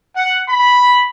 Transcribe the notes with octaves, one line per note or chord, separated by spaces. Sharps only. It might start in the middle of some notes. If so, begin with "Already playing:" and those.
F#5
B5